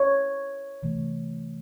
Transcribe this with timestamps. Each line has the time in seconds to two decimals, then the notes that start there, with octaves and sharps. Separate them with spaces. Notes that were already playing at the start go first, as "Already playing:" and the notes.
Already playing: C#5
0.83 C3 E3 A3